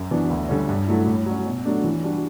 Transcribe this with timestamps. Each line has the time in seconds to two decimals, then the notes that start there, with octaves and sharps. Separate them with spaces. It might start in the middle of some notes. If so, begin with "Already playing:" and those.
Already playing: F#2
0.11 E3 B3 D4 F#4
0.30 D2
0.48 D3 G3 C#4
0.69 G2
0.87 F#3 A3 E4
1.06 A2
1.26 F#3 C#4
1.46 B2
1.65 F#3 A3 D4
1.84 E3
2.03 G3 D4 F#4